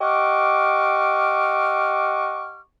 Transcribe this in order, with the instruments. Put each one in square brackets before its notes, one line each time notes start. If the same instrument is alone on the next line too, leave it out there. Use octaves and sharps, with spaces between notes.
[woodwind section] G4 D#5 F#5 C#6 D6 F6